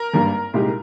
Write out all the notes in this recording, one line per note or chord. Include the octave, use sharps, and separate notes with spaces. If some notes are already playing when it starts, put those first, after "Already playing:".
Already playing: A#4
G#1 G2 G3 A#3
C2 A#2 G#3 D#4 G4